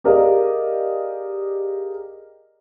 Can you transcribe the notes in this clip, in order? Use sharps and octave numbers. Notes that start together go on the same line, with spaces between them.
G4 G#4 A#4 D5 D#5 F5